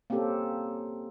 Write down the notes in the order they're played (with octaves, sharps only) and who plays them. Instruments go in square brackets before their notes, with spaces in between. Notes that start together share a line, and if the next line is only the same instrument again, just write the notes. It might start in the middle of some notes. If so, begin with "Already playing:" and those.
[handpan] A#3 C4 C#4 G4 A4